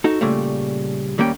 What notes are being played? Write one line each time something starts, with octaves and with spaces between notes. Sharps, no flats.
D#4 F#4 A4
A#2 C#3 G3 A3
D#2 G3 A#3 C#4 G5